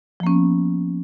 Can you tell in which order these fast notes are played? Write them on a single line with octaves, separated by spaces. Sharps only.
F3 A#3 C#4 B3